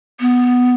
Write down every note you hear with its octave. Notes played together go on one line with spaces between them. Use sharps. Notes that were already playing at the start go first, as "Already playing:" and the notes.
B3